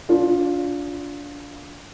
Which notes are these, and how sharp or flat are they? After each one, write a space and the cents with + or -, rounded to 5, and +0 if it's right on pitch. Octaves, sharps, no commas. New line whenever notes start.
D4 -25 F4 +15